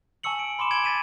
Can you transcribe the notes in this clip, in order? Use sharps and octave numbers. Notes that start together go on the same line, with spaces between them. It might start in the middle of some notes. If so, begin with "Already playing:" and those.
G#5 A5 C#6 E6 C#7 F#7
D7
B5 C6 D6 E7
C6 G#6 D7 E7 F#7 G7
A6 B6 D#7 E7